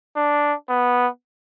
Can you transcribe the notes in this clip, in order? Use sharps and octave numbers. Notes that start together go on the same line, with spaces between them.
D4
B3